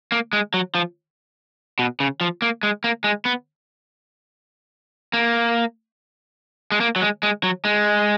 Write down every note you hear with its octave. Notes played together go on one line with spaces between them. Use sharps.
A#3
G#3
F#3
F3
B2
C#3
F3
A#3
G#3
A#3
G#3
B3
A#3
G#3
A#3
F#3
G#3
G#3
F#3
G#3